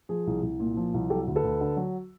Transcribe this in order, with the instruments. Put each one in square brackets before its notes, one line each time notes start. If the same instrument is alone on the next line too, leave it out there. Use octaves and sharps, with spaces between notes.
[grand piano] F3 G#4
C2
C2
A#2
F3
C2
F#3 G4 A4
D2
A4 B4
D2
D3
F#3